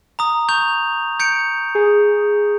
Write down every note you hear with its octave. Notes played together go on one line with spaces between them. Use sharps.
A#5 D#6
C#6 G6 F7
G6 C#7 D7
G#4